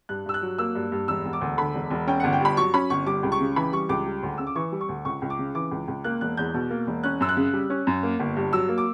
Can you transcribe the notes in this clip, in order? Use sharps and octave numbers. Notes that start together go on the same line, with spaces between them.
G2 F#6
G2 E6
F#6
F#3
A#3 E6
G2
G2
E1 E6
E1
D6
D2
D3 B5
E1
E1
C#4 G5
G1 F#5
G5
G2 B5
F#3 C#6
C#4 B5
G1 C#6
G3 D6
C#2
C#6
C#3
E3 B5
G3 C#6
C#2 D6
G3
D2
C#3 E6
D6
E3 C#6
G3
C#6
D2
C#2 C#6
C#2
D6
C#3
E3 D6
C#2
C#2
A#3 F#6
E1 F#6
E2 G6
B2
A#3
E1
C#4 F#6
F#2 E6
F#6
C#3
G3
C#4
F#2
A#3
G1
G2
F#3 E6
A#3
D6